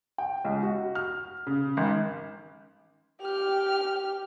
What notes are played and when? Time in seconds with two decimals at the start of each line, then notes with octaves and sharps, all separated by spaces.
0.18 G5
0.44 C#2
0.63 F#4
0.95 F6
1.47 C#3
1.77 G#1
3.22 G4 F6